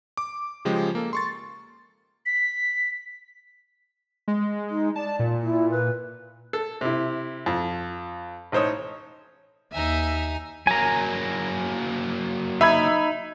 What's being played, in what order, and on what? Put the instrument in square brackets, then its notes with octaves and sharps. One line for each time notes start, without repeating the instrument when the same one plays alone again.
[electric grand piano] D6
C#3 F3 G#3 G4
A#3 A4
C6 C#6 A6
[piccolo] B6
[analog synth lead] G#3
[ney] D#4
[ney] D5 [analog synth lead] A5
[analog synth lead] A#2
[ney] E4
B4
[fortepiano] A4
C3 E4
F2
A1 D#4 C5 C#5 D#6
[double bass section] D#2 [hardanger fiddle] D#4 G#5 [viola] E5
[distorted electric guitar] F#3 A#3 [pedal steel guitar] G#5 A#5
[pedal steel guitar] D#4 [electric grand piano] E5 B5 G#6